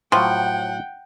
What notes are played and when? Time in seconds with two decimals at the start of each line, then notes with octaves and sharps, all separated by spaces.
0.12 A2 F3 F#3 F#5 G5